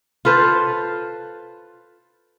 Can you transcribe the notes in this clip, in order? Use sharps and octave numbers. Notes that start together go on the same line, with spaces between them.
F4 A4 B4 C5